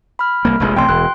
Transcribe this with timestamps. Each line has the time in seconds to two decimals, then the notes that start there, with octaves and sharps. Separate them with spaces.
0.19 B5 F6
0.45 C2 A#3
0.60 F1 A#1 G#3
0.76 A1 C3 G5 C6
0.89 E1 F#6